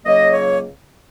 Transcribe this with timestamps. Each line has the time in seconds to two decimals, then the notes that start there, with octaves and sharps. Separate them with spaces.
0.05 C#2 C#3 F#3 A#3 D#5
0.31 C#5